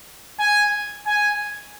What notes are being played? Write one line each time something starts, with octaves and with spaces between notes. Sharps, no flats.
G#5
G#5